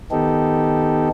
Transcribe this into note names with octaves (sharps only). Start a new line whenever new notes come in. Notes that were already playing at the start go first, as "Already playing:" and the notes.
D#3 B3 D#4 G4 A4